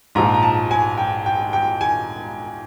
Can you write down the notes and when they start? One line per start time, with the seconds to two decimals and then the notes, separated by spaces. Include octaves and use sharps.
0.15 A#1 G#2 F3 A#5
0.34 A#5
0.43 A5
0.71 G#5
0.98 G5
1.26 G5
1.53 G5
1.81 G#5